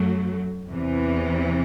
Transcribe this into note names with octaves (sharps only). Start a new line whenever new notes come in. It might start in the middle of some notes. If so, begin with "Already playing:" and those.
Already playing: F#2 F#3 A3
E2 C3 E3